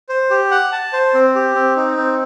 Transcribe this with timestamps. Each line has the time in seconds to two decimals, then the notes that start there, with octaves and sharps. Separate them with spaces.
0.09 C5
0.30 G4
0.51 F#5
0.72 A5
0.93 C5
1.14 C4
1.35 G4
1.55 C4
1.77 D#4
1.97 C4